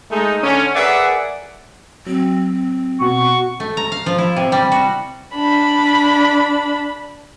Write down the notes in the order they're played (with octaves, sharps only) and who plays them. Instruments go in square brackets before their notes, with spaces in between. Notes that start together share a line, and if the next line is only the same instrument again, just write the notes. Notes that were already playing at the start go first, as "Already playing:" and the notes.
[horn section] G#3 A3 D#4
D3 C#4
G#4 A#4 B4 D5 E5 F#5
[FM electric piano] F#3 [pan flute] C4
[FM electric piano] B2 [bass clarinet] F#4 [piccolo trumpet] C#6
[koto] A3
A#5
F5
F3
E4
C3
G3
F#4
[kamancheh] D4 B5